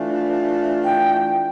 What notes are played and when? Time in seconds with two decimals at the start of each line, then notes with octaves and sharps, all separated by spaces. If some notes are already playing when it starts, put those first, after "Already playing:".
Already playing: E3 A3 D4 F4
0.84 G5